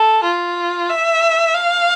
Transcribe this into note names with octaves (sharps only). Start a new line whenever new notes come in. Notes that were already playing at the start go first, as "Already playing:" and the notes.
Already playing: A4
F4
E5
F5